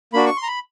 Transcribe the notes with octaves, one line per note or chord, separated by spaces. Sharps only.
A#3 D4 F#4 B5
C#6
C6
A#5
B5